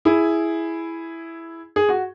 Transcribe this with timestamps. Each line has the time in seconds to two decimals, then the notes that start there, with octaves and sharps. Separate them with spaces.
0.05 E4 G#4
1.76 G#4
1.89 F#4